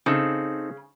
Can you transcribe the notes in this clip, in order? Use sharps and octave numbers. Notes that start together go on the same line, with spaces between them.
C#3 C4 D#4 A4